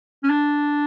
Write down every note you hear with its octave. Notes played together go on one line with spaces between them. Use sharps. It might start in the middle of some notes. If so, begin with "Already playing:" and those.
C#4
D4